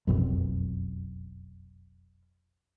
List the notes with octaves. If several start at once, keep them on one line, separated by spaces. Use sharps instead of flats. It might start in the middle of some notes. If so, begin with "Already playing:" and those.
F1 B1 F#2